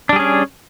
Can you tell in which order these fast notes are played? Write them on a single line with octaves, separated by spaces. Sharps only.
D4 G3 G#4 C#4